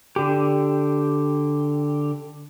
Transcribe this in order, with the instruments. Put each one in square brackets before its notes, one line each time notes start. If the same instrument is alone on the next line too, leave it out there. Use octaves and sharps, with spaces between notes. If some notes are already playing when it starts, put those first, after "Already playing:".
[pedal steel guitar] D3 G4